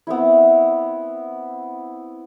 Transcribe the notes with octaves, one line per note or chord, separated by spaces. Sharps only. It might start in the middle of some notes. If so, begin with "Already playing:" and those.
B3 C4 E4